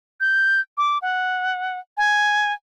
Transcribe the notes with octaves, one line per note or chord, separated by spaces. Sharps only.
G6
D6
F#5
G#5